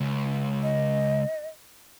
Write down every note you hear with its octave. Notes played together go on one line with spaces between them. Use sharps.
C#2
D#5